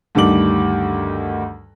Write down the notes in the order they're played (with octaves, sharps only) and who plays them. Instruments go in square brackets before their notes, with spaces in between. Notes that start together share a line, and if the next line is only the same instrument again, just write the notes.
[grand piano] D2 G2 D#3 G3 D6 F#7